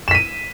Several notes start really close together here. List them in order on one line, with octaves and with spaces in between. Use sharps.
E7 B6 D#7